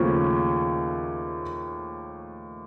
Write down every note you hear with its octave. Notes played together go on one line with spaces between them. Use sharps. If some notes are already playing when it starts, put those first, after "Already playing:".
Already playing: D#2 C#3 F3 A3 C#4